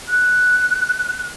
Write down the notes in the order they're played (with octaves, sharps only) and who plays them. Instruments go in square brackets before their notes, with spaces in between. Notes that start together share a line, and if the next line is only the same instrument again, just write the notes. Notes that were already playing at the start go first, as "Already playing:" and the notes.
[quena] F#6